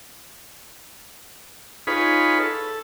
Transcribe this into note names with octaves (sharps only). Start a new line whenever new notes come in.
D#4 F4 G#4 B4 C#5 B5
A4